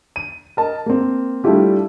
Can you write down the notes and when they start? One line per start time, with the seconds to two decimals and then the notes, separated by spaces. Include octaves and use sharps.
0.16 D#7
0.57 A#4 D#5 A5
0.86 A#3 C4
1.44 G3 A3 D4 E4 F4 G4